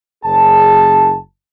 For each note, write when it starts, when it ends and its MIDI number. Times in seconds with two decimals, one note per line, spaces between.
0.24 1.16 30
0.24 1.16 68
0.24 1.16 81